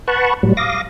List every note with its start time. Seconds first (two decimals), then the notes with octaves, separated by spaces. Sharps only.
0.08 B4 F#5 A5 B5 C#6
0.43 A2 F#3 G3
0.57 F5 D6 D#6 A#6